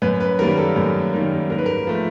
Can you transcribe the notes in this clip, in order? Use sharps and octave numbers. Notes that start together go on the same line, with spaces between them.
F#2 B4
B4
D#3 G3 A#3 A#4
A4
F#2
D#3 G3 A#3
G#2 A#4
B4
A#4
F3 A3